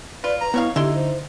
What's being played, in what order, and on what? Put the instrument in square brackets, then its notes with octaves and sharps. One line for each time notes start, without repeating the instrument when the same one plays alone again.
[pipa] F4 [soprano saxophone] B4 [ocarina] D5
[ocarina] B4 [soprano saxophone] A#5
[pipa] B2 C#5 F5 [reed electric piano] B3 [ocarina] E4
[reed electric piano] D3 [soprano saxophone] D#4 [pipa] E4 C6 [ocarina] G4
[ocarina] C5